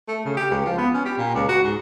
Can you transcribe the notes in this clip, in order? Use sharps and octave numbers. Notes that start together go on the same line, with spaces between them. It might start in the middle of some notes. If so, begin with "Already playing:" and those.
A3
C#3
G4
C#2
F3
B3
C#4
G4
A#2
C#2
F#4
G#2